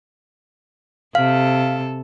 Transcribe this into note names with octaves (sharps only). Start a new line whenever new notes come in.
C3 A4 F5